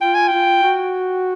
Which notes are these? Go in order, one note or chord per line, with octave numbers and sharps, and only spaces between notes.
F4 G5
G#5
G5
F4
F#4